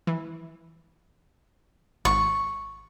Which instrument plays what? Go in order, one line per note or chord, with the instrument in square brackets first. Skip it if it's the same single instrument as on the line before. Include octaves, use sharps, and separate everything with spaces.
[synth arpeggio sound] E3
[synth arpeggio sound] G#1 [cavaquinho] C#6